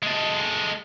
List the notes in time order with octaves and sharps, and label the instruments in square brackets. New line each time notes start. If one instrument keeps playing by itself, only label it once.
[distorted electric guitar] G#3 A4